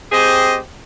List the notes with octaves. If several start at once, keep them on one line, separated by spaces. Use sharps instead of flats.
C4 G4 G#4 C5 D#5